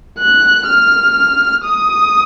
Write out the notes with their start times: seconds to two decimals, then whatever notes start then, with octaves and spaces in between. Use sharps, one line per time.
0.19 F#6
0.67 F6
1.65 D#6